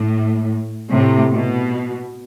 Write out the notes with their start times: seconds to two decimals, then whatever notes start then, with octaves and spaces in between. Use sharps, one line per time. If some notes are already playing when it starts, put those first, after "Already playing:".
Already playing: A2
0.89 A2 C3
1.33 B2